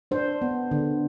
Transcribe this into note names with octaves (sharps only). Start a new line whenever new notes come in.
D4 C5
B3
D3